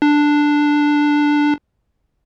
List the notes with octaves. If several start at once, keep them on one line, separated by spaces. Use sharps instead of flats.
D4